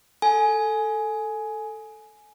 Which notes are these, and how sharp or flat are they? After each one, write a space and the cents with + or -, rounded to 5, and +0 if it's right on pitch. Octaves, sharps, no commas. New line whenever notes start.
A4 +5 G#5 +15